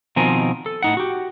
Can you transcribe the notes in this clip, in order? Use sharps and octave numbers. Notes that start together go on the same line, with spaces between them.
B2 D#3 F3 C4 A#4 G#5
A4
A2 D#4 F#5
F#4 G4